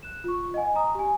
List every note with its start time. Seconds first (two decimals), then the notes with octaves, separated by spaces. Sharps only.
0.03 F#6 E7
0.24 F4 C#6
0.54 D#5 F#5 G#5
0.75 A#5 D#6
0.95 G4 G#5